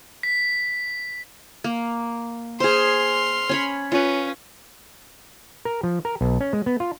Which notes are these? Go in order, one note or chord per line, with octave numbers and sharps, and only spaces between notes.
B6
A#3
G#4 C5 C6 F6
C#4 C#5 B5
C#4 F4 B4
A#4
F3
A#4
B1
C#4
G#3
B3
F4